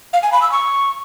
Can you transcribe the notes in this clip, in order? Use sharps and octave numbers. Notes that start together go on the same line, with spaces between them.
F5
G#5
B5
E6
C#6